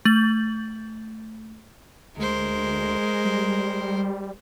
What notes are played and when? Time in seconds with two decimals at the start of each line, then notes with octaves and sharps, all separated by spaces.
0.05 A3 A6 F#7
2.17 D2 G#3 A#4 C5
3.25 G3